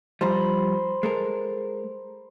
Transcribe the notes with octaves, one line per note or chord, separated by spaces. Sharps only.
G2 F3 G3 C5 A#5 B5
G#3 A4 A#4